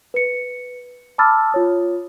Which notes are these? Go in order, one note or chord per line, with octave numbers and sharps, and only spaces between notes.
B4 C#7
A5 B5 D6 E6 F6 A6
F4 C#5 D#6